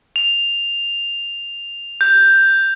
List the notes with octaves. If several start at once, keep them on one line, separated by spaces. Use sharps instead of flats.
F7
G6